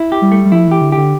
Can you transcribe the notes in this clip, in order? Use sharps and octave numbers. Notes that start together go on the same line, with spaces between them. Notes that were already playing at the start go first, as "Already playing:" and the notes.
Already playing: E4
G4
G3
A3
G3
F3 E4
E3 G4
D3
D3 G4